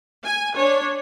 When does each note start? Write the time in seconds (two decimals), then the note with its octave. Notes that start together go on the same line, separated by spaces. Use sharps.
0.24 G#5
0.56 D4 C#5